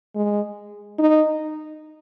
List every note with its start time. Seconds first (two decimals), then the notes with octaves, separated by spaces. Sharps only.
0.15 G#3
0.99 D#4